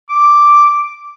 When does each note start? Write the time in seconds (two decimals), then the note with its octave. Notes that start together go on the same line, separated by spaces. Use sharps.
0.09 D6